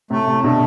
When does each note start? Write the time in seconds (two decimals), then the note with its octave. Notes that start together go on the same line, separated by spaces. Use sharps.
0.10 A2 C3 A3
0.27 A2 C3
0.44 B2 D3 A3